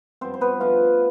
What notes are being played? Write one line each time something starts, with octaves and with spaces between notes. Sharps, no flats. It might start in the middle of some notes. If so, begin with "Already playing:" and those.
G2 F3 B3 C4 C5
C5
B3 B4
D3 F3 A3 F4